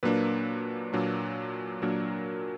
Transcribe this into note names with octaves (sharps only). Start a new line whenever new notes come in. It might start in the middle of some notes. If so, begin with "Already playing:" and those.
A#2 F#3 A#3 D4 B4
A#2 F#3 A#3 D4
A#2 F#3 A#3 D4 A#4